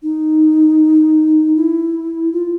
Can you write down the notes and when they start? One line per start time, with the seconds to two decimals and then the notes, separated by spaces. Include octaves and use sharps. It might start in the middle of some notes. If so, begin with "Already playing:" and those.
0.03 D#4
1.56 E4
2.32 F4